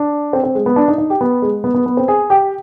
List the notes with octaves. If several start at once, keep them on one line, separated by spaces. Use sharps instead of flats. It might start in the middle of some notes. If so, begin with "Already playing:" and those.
Already playing: D4
C4
C4
G#3
B3
D4
D#4
D#4
G4
B3
G#3
B3
B3
B3
C4
G#4
G4